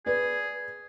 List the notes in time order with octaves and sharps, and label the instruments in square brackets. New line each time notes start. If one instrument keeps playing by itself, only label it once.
[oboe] G#4 [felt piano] B4 D5